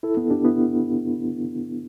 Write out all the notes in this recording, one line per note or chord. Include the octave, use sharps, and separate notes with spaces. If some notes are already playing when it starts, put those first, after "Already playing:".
E4 A4
B3 E4
D4 G4
B3 E4